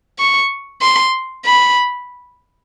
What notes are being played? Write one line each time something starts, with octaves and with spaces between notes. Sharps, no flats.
C#6
C6
B5